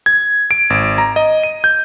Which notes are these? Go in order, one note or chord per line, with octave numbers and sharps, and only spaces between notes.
G#6
D7
G#1
A#5
D#5
D#7
G6